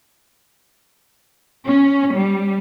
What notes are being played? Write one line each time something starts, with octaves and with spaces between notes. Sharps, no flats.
C#4
G3